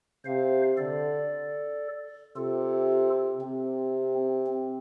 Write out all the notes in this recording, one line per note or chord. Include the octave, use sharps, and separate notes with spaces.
C3 C5 F5
D3 A4 D5
C3 F4 A4
C3 C4
C4